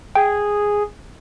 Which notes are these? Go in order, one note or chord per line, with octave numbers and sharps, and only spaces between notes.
G#4 G5